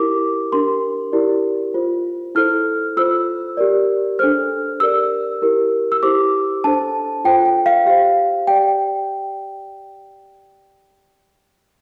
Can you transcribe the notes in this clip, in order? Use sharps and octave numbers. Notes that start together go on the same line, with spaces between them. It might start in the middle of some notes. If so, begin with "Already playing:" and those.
Already playing: E4 G4 A#4 D6
D4 G4 A#4 C6
E4 G4 A#4 D5
F4 C5
E4 A4 C5 F6
F4 A4 C5 E6
G4 A#4 D5
D4 A4 C5 F6
G4 A#4 D5 E6
E4 G4 A#4
E6
E4 G4 C5 D6
D4 A4 C5 A5
F4 A4 C5 G5
G5
F5
G4 C5 F5
G4 D5 G5